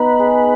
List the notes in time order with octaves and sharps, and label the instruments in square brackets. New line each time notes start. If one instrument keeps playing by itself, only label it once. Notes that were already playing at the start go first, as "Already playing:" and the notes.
Already playing: [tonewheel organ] B3 B4 [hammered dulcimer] D#4
[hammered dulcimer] G#4